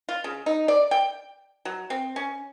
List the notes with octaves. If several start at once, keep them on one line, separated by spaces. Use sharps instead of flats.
F4
C#3
D#4
D5
G5
F#3
C4
C#4